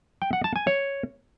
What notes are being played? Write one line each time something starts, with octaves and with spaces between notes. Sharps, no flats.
G5
F#5
A5
G#5
C#5